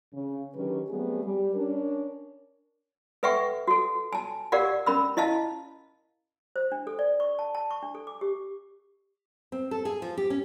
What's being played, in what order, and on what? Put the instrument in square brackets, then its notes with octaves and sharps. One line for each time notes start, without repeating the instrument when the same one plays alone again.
[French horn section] C#3
D3 D#3 F#3 C#4 G4 B4
F#3 G3 A3 B3 C4 G#4
G3
C#4 D4 A#4
[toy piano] A4 B4 E5 F#5 G5 C#6
F#4 A4
G#5 A5
G4 A#4 D5 F5 F#5
C#4 A#4 B5 E6
E4 D#5 F5 A5
C5
D4
A4
D5
C#6
A5
A5
C#6
D4
A4
D6
G4
[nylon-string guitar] C4
A4
G#4
F3
G4
C#4